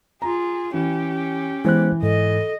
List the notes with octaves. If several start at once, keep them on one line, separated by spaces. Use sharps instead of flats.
F4 G#4 A#5
E3 C#4 G4
E3 G#3 B3 C5 F#6
G#2 A4 D#5